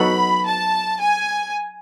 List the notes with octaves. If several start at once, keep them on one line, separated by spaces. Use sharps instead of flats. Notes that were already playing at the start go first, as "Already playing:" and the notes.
Already playing: F#3 B3 D#4 F#4 A4 B5
A5
G#5